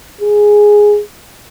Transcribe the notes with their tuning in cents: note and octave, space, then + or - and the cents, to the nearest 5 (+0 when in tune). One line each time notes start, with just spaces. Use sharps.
G#4 +0